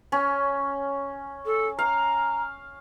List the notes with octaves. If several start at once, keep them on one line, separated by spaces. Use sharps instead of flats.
C#4
A4
F5 A#5